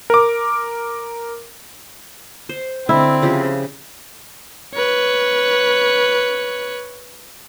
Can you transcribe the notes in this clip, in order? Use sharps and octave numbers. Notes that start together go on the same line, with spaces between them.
A#4 D6
C5
D3 C4 E4
C#3 F3 G4
B4 C#5